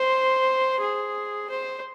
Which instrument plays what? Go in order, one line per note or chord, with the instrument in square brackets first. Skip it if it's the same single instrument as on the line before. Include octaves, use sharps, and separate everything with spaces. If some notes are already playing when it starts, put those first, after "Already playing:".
Already playing: [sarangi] C5
G#4
C5